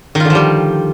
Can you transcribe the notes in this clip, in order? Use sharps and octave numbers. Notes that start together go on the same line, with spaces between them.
D3 D#3 F3 G3 F4